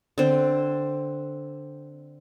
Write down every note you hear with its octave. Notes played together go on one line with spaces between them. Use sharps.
D3 C4